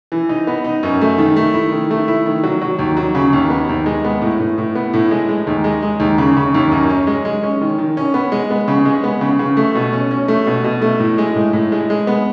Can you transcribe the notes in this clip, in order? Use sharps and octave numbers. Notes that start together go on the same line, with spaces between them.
E3
D#4
B3
D#4
F#2
A3
D#3
A3
E4
D#3
A3
E4
D#3
F#3
F#3
D#2
F#3
C#3
D#2
B3
D#2
G#3
B3
A2
A2
A2
B3
A2
G#3
G#3
D#2
G#3
G#3
D#2
C#3
C#3
D#2
F#2
C#4
G#3
G#3
C#4
D#3
D#3
C#4
B3
G#3
B3
C#3
G#3
B3
C#3
C#3
A3
B2
C#4
C#4
A3
B2
B2
A3
A2
G#3
A2
A2
G#3
G#3
B3